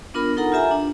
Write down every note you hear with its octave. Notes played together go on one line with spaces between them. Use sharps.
B3 D4 F4 A#4 B5
D#4 A4 A#4 F#5 A#5
F4 G4 E5 G#5 A#5
D4